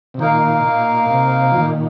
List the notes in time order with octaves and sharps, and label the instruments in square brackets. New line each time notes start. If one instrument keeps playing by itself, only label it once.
[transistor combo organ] C3
[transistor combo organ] A#2 D#3 [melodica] A#3 D#4 A#4 F5
[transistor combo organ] A#2
C3
F3
A#2 D#3